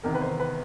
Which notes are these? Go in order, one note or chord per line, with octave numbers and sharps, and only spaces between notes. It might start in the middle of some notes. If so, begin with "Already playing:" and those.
E2 C3 D#3 A#4
B4
C5
B4